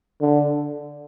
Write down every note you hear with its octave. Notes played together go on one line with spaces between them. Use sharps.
D3